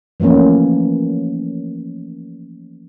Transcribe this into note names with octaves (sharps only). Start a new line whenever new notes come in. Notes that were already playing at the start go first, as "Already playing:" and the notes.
E3 F3 A3 A#3 C#4